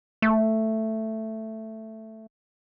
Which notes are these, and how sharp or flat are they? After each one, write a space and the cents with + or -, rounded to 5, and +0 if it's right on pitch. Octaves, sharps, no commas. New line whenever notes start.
A3 +5